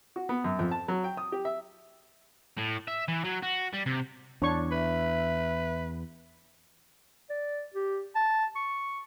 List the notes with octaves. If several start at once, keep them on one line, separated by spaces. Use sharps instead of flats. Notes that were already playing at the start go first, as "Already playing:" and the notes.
F#4
B3
F#2
F2
A5
F#3
G5
D#6
G4
E5
A2
E5
E3
F#3
F#4
G3
C3
E2 D4 C#5 C#6
B4 E5
D5
G4
A5
C#6